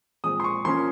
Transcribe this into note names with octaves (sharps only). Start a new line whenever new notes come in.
A#2 F3 G#3 C4 D#6
C6
C#6
F3 A#3 C#4 C6